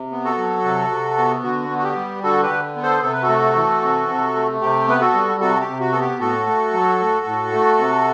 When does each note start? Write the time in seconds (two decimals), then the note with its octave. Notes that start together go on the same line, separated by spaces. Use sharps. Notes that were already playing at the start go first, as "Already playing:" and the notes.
Already playing: C3
0.11 B3
0.24 F#4 A4
0.38 F#3
0.64 C3
0.91 C3
1.18 B3
1.43 D3 F#4
1.70 B3
1.79 F#4
1.84 G4
1.96 G3
2.23 D3 F#4 A4
2.43 G4 B4
2.50 D3
2.76 B3
2.83 A4 C5
3.02 C3 A4
3.13 B4
3.23 F#4 A4
3.29 A3
3.56 E3
3.82 C3
4.08 C3
4.35 A3
4.61 C3 G4
4.88 B3 B4
5.01 F#4 A4
5.14 G3
5.40 C3 F#4 A4
5.60 G4
5.67 C3
5.80 F#4
5.93 B3 A4
6.00 G4
6.20 A2 F#4 A4
6.47 A3
6.73 F#3
6.99 A2
7.26 A2
7.52 A3
7.78 C3